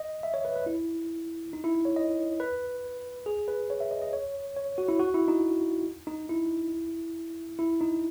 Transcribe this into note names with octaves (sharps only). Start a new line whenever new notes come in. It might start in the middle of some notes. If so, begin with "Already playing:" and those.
Already playing: D#5
E5
C#5
B4
B4
E4
D#4
E4
C#5
D#5
B4
G#4
B4
C#5
E5
D#5
D#5
C#5
C#5
F#4
E4
F#4
E4
D#4
D#4
E4
E4
D#4